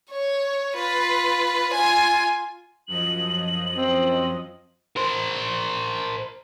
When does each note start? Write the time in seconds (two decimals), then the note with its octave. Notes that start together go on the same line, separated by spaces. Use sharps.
0.11 C#5
0.75 F4 B4
1.74 F4 G#5
2.88 F#2 F3 D#5 F#7
3.77 C4
4.96 A#4 C5